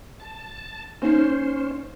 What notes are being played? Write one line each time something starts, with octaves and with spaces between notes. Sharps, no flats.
A5
A#3 C#4 D#4 C5